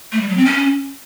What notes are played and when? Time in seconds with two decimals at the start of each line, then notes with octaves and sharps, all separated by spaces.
0.12 A3
0.20 G3
0.29 F#3
0.37 C4
0.45 C#4